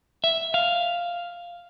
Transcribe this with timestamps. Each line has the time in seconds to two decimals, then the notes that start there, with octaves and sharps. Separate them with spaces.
0.24 E5
0.54 F5